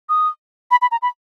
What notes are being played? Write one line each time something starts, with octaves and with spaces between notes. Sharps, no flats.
D#6
B5
B5
A#5
B5